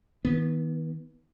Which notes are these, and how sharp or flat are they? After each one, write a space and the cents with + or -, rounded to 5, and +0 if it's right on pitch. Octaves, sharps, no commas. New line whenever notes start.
D#3 +35 B3 -20